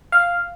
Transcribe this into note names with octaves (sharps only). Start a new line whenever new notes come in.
F5